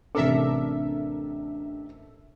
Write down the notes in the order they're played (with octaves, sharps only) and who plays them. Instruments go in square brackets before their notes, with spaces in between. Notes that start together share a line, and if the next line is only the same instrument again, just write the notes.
[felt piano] A1 C3 D6 [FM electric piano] D4 [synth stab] A4 A#4 E5